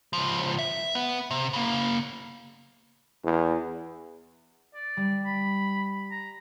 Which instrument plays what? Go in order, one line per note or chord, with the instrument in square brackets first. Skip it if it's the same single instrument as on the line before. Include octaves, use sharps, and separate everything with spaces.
[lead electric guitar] C#2 F3
E5
B3
C3
C#3 A#3
[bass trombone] E2
[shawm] D5
[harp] G3
[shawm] B5
A#5